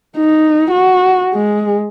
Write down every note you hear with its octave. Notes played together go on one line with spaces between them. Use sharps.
D#4
F#4
G#3